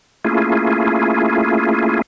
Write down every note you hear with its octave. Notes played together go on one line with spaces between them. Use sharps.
A3 A#3 C#4 E4 F4 G#4